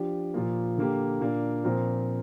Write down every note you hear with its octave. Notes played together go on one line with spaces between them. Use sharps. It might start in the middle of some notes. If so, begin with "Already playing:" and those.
Already playing: F3 D4 G4
A#2 F3 A#3
D3 A#3 G4
A#2 A#3 D4
A#2 F3 C4 A#4